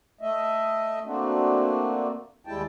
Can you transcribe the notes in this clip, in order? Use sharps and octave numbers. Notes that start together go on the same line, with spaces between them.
A3 D#5 E5
A3 A#3 C4 D4 F#4
D#2 G3 G#3 E4 G5 A5